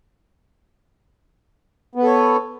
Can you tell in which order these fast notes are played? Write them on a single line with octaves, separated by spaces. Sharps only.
B3 B4 A4 C#5